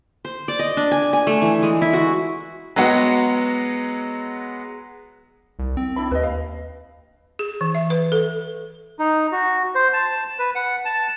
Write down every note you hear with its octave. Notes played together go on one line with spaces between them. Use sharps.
C5
D5
D#5
D4
G#5
G#5
A3
E3
G#3
E4
F#4
F#3 G#3 B3 F#4
C2
C4
D4 E4 B5
D#2 B4 D#5
F5
G#4
E3
E5
B4
A4
D#4
F#4
C5
A5
B4
F#5
A5